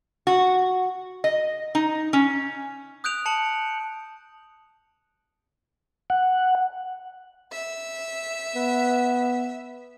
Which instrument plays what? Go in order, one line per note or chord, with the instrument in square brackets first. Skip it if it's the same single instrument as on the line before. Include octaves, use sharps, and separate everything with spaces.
[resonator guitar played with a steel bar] F#4
D#5
D#4
C#4
[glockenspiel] D#6 F#6 G6 D7 F7
A5 C#7 F#7
[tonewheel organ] F#5
[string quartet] E5
[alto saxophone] B3